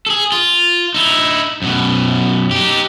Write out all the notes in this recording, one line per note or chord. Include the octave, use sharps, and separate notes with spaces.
G#4 A4
F4
D#4 E4
F#2 B2
D#4 G4